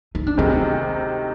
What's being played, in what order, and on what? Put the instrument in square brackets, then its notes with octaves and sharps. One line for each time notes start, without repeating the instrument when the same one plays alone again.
[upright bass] D#4
D4
[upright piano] D2 C3 D#3 G#3 [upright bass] C4